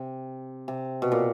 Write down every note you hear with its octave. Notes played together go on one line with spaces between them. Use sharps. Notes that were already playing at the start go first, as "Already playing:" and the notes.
Already playing: C3
C3
B2
A#2